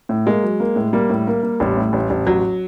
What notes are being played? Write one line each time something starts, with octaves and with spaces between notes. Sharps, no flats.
A2
G#3 A#3
F#3
A#3
A2
G3 A#3
A2
A#3
A#3
A1 G3
A2
A1
A1
A1 F#3